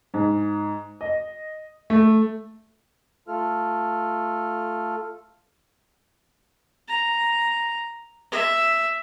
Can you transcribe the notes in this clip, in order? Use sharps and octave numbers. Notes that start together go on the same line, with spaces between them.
G#2
D#5
A3
A3 F4 A4 F6
A#5
E5